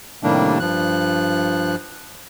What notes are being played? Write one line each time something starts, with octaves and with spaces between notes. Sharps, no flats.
A2 C3 D#3 G3 A#3 D4
G2 F3 F#6